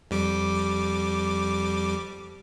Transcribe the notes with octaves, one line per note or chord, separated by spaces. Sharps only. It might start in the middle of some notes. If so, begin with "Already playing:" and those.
F2 G3 D6